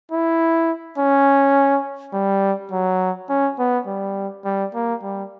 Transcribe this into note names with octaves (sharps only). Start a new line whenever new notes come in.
E4
C#4
G3
F#3
C#4
B3
G3
G3
A#3
G3